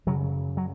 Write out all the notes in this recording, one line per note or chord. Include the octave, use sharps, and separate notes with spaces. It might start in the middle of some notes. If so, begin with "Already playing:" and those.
F#2 C#3 F#3
F#3